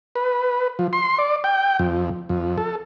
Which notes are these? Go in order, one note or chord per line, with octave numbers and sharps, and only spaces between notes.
B4
F3
C6
D5
G5
F2
F2
A4